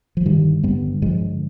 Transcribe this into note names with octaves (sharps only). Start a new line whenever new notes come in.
F3
G2 D#3 G3
D3
G2 G3 B3
D3
G2 F3 G#3
D3